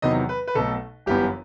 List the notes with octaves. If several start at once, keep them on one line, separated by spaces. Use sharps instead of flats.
E2 C3 D#3 F#3 B3 D#5
B4
B4
B1 B2 A3 A4
G1 F#2 E3 B3 G4